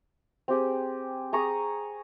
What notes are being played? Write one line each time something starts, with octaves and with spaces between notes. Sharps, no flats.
C4 G4 G#4
G#4 A#5 C#6 D#6